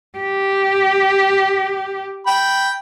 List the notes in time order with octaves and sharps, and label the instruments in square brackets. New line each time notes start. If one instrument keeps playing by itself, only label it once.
[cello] G4
[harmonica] G5 B5